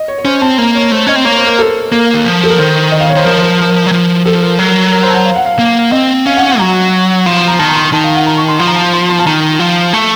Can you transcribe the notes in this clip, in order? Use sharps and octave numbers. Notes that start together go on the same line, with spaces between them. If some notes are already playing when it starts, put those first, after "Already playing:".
Already playing: D#5
C#5
C#5
C#4 C5
C4 A5
A#3 A#5
C#5
A3 C5
C#4 D#5
C4
A#3 C#5
C5
A#4
A4
A#3 A#4
D#3
F3
A4
A#4
D#3 C5
D#5
F5
C#5
D#3 C5
F3 A#4
C5
A#4
A#4
F#3
F3
F3 A4
A#4
F#3 A#4
A#4
C5
A5
F#5
F5
F#5
F5
A#3
C4 D#5
C#4 F5
F#5
F#5
F#3 A#5
F3 C6
C6
A#5
D#3 A5
A#5
C6
D#3 A5
F5
F#5
A#5
C#6
C6
F3 C6
A#5
A5
C6
C6
A5
D#3 A#5
F3
A3 A5